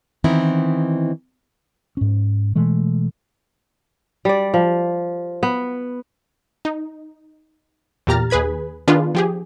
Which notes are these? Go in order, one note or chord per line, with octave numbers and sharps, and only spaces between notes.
D#3 E3 B3 C4 D#4 E4
G#2 C#4
B2 E3 G#3 A3
G3 D5
F3
B3
D#4
E2 A#2 G4 A#5 F6 A6
D#2 G#4 B4 B5 G#6
D#3 B3 D4 F4 G#4 B4
F3 G4 G#4